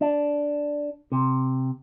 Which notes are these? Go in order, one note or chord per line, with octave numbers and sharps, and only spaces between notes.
D4
C3